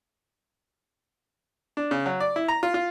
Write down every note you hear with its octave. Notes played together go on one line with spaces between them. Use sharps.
D4
C#3
F#3
D5
E4
A#5
F4
F4